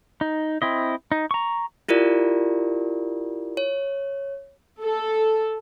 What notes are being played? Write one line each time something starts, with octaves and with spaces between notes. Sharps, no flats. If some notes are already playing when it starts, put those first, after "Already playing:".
D#4
C4 E4 D#5
D#4
A#5 C#6
E4 F4 G4 A#4 D5
C#5
A4